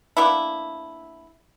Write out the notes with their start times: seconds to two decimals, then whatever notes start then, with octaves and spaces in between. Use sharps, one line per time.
0.17 A#3 B3 D4 E4